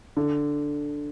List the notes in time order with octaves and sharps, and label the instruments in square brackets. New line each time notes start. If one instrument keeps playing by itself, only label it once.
[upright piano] D3